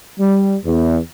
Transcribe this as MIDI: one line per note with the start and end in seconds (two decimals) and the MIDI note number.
0.20 0.55 55
0.65 0.98 40